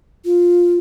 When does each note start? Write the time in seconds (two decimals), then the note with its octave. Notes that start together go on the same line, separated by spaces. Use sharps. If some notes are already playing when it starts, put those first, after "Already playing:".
0.25 F4